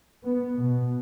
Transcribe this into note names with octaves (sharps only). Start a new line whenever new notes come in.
B3
B2